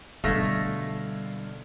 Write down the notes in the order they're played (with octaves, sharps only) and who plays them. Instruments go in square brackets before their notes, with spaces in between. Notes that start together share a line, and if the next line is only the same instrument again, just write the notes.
[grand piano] B2 D3 G#6 [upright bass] G3 [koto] A3 [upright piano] F5 A#6